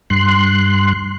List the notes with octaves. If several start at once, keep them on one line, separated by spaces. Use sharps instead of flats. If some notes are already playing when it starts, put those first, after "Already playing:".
G2 C6 F#6